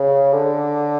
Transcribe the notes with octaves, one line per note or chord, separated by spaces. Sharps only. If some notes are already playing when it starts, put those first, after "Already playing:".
Already playing: C#3
D3